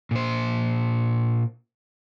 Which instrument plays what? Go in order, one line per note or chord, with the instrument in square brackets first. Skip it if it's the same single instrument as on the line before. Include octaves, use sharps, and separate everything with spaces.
[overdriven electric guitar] A#2 C5